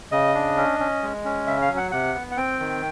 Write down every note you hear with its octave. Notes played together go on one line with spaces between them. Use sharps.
C#3 D#5
D4
C#4
C#4
G#3
C#4
C#3 E5
F5
F#3
F#5
C3 F#5
B3
F#5
C4 G5
D#3